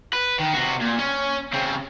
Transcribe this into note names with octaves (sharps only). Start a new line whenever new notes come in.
B4
D#3
C3 F#4
A#2
C#4
C#3 C4